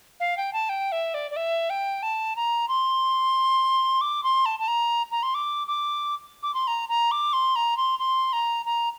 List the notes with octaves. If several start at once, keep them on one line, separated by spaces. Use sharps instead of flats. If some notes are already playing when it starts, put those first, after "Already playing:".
F5
G5
A5
G5
E5
D5
D5
E5
G5
A5
A#5
C6
D6
C6
A5
A5
A#5
A#5
C6
D6
D6
D6
C6
A#5
A#5
D6
C6
A#5
C6
C6
A#5
A#5